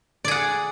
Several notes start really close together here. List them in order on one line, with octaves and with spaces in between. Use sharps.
D5 G#4 F#5